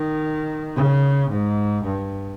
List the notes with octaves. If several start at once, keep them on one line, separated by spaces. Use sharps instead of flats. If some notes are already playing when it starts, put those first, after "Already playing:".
Already playing: D#3
C#3
G#2
G2